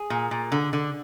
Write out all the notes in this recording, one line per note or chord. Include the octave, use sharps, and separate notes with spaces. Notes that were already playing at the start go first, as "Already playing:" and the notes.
Already playing: G#4
A#2
A#2
D3
D3